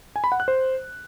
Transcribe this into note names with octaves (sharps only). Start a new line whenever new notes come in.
G#5
B5
F#5
F#6
C5